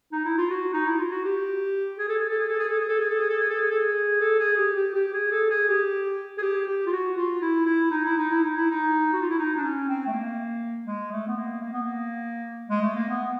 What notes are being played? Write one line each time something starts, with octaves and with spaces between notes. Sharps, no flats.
D#4
E4
F4
F#4
D#4
E4
F4
F#4
G4
G#4
A4
G#4
A4
G#4
A4
G#4
A4
G#4
A4
G#4
A4
G#4
A4
G#4
A4
G#4
A4
G#4
A4
G#4
G4
G4
G4
G#4
A4
G#4
G4
G#4
G4
G4
F4
F#4
F4
E4
E4
D#4
E4
D#4
E4
D#4
E4
D#4
F#4
F4
E4
D#4
D4
C#4
C4
A3
A#3
G#3
A3
B3
A#3
A#3
B3
A#3
G#3
A3
A#3
B3